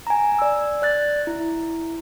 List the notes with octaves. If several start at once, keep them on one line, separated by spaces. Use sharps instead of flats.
G#5 A#5
D5 E6
D5 F#6 A6
E4